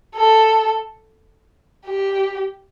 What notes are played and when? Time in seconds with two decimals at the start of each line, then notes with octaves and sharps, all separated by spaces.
0.16 A4
1.86 G4